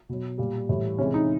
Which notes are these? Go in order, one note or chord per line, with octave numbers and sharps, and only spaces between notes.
B2 F#3
A#2 G3
A2 E3 G3
C3 E3 G#3 C#4
D#4